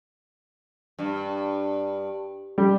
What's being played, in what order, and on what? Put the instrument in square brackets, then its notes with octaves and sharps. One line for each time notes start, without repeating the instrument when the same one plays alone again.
[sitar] G2
[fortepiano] G3